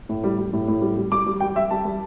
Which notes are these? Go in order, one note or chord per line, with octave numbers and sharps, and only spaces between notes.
A2
G3
G3
A2
A2
G3
G3
G3 D6
G3
G3 G5
G3 E5
G3 A5
G3